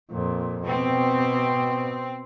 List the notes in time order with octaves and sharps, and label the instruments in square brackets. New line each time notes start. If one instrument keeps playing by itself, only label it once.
[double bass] F2 A#2
[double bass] B2 [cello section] C4